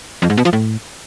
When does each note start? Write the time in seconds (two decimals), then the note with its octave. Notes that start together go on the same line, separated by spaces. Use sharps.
0.22 F2
0.30 G#2
0.37 B2
0.45 F3
0.53 A2